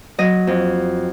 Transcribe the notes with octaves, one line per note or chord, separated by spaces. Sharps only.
F#3 D#5
F2